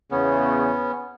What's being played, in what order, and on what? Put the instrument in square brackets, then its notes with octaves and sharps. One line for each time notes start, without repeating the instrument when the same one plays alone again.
[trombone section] E2 C#3 [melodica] B3 C#4